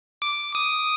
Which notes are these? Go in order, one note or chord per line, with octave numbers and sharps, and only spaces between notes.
D6
D#6